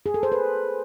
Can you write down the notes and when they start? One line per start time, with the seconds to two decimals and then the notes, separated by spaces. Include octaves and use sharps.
0.06 G#4
0.14 A4
0.23 C5
0.32 B4